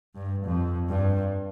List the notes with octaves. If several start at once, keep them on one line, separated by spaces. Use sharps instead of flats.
G2
F2
G2